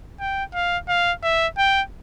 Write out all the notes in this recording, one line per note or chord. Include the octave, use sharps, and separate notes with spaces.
G5
F5
F5
E5
G5